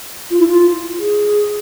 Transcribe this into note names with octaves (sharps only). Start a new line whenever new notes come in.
F4
E4
F4
G#4